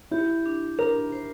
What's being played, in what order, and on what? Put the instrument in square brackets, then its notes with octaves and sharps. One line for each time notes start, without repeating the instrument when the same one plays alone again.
[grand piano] E4 [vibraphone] G4
[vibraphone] D4
[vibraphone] D4 [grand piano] A#4
[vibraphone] C5